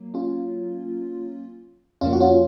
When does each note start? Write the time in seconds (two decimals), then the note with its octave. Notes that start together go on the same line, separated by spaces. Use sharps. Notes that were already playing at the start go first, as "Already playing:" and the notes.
Already playing: F#3 A#3
0.14 C#4 F4
2.01 F2 C#3 F3 A#3 C#4 F4
2.13 F#4
2.20 C#4 F4